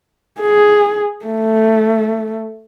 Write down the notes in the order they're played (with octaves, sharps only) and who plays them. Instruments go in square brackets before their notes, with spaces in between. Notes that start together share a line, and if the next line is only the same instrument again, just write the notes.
[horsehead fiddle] G#4
A3